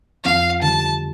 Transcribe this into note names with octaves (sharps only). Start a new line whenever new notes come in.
F2 F5
D3 G3 A5